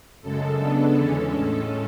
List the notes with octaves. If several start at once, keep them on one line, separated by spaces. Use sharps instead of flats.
F#2 C#3 G#3 A4
C#3 G#3 B3 D4
E2 D3 G#3 C#4 A4
A2 G#3 C#4